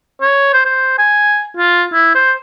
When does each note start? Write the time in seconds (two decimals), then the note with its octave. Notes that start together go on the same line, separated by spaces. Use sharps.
0.21 C#5
0.53 C5
0.65 C5
0.98 G#5
1.57 F4
1.93 E4
2.15 C5